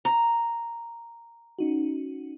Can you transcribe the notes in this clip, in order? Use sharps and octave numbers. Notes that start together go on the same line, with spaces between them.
A#5
C#4 D#4 F#4